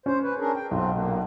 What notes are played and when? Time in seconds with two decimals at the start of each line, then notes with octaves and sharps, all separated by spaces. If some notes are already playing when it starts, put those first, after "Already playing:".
0.06 C#4 C5
0.22 B4
0.38 D4 G#4 A#4
0.55 G5
0.71 B1 C4 F4
0.93 A#2 A#3